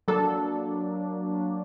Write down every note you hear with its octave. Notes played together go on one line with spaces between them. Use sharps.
F#3 A#3 D4 A4